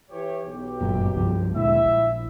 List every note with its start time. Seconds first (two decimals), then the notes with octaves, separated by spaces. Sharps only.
0.11 E3 G4 C#5
0.45 B1 G4
0.81 G1 F#2 A#2
1.16 C2 G2 F3
1.55 D2 A#2 G#3 E4 E5
1.85 A#1